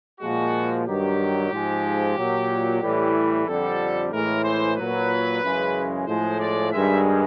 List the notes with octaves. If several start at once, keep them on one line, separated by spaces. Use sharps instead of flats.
A#2 F3 G#3 F#4
G2 D#3 F#3 G4
G#2 F3 G#3
A#2 F#3
A2 E3 G3
F2 D3 G3 A4
A2 E3 G#3 A#4
C5
A#2 F#3 B4
F#2 C#3 E3 G#3
A2 F3 G#3 C5
D5
G2 D#3 G#3 E5